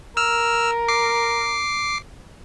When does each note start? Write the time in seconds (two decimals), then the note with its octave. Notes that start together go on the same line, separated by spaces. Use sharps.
0.17 A#4 E6 F6
0.88 D6 C7